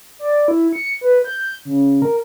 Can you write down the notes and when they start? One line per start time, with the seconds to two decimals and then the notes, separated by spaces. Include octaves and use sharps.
0.19 D5
0.48 E4
0.73 C#7
1.01 B4
1.25 G6
1.65 C#3
2.02 A#4